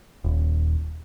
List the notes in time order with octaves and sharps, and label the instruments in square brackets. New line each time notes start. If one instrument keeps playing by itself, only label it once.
[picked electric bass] D#1